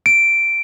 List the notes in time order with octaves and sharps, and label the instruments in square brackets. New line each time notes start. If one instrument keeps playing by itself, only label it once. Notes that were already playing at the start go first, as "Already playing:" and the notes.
[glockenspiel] D7